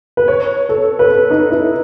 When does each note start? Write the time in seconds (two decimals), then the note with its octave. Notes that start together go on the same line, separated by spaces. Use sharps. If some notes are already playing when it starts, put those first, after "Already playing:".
0.17 B4
0.28 C#5
0.69 A4
0.99 B4
1.10 A4
1.31 D#4
1.51 E4